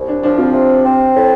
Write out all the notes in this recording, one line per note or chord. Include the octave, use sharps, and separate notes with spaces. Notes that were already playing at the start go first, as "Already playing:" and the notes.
Already playing: C2
D4
F3 D4
C4 F4
C3
C4
A2